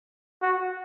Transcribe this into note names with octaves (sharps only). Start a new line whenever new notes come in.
F#4